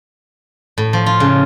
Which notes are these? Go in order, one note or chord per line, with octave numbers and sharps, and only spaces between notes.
A2
F3
F4
C#3